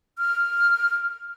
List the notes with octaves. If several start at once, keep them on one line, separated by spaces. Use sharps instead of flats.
F6